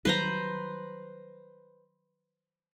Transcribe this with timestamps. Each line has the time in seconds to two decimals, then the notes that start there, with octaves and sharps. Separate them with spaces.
0.05 D#3 F#3 G3 B4 C5 A#5